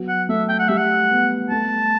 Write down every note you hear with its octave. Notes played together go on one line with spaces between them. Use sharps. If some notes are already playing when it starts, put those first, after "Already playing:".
Already playing: F#3 B3
F#5
A3 E5
G5
F#5
G3 E5
F#5
B3
A3 A5